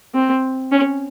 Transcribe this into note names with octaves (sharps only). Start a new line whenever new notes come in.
C4
C#4